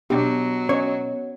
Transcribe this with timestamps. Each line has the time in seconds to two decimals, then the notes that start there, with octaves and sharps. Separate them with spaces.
0.10 B2 F#3 D4 G4
0.69 C#4 C#5 D#5